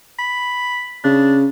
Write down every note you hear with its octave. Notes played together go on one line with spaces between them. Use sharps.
B5
C#3 D4